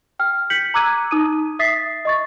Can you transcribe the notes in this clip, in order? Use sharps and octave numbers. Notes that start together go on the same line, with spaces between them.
G5 F6
G6 B6 C#7 F#7
A#5 D6 E6 F#6 G#6 D#7
D#4 D#6 D#7
E5 D#6 A6 B6 C7
D#5 C#6 A6